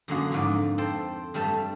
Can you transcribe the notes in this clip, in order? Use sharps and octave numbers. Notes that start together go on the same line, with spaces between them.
F#2 D3 A#3 F#4 G#4
F2 G#2 D5
A4 C5 G5 A5
G2 G3 A3 A4 A5